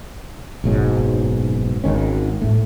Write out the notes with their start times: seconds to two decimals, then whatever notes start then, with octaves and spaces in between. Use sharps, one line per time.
0.64 F#1 B1 G#2 F#3
1.84 G#1 D#3 C#4
2.41 A2 A3